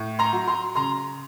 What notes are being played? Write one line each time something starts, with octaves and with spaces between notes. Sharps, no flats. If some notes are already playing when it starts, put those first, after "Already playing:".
Already playing: A2
A#5 C6
F#3
A#5 C6
C#3 A#5 C6